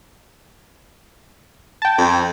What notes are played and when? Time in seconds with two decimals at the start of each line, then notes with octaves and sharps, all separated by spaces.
1.82 G5 A5
1.98 F2